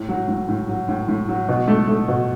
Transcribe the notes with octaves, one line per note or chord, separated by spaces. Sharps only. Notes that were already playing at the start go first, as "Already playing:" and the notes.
Already playing: A2
F#3
A2
A2
F#3
A2
A2
F#3
B2
A3
A3
B2